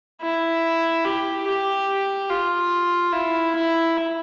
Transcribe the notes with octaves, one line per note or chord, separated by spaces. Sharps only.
E4
G4
G4
F4
E4
E4